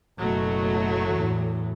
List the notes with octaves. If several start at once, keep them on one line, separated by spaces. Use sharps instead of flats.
F#1 B2 F#3 A3
E2 A2